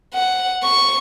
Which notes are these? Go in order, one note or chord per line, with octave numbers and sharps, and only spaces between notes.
F#5
C#6